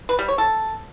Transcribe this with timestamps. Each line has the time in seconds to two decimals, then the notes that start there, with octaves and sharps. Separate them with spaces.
0.09 B4
0.19 G3
0.28 C#5
0.38 A4